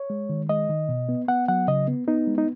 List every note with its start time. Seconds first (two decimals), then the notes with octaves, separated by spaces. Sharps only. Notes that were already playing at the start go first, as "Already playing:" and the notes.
Already playing: C#5
0.10 G#3
0.29 D#3
0.49 G#3 D#5
0.69 D#3
0.89 B2
1.09 B3
1.28 B3 F#5
1.48 F#3 F#5
1.68 C#3 D#5
1.88 B3
2.07 B3 D#4
2.27 G#3
2.38 D#4